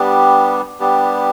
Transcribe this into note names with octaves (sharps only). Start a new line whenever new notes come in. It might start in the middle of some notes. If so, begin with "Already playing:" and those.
Already playing: G3 B3 D4 G4
G3 B3 D4 G4